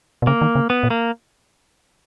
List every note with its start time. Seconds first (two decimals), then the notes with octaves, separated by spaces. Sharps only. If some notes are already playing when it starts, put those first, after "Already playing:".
0.22 B2
0.27 C#3 A#3
0.41 D#3
0.55 C#3
0.70 B3
0.83 A#2
0.90 A#3